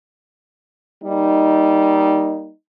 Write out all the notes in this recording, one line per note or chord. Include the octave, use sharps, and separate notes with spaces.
G3 A#3 D#4